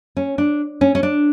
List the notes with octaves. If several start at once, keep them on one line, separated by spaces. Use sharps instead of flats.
C#4
D4
C#4
C#4
D4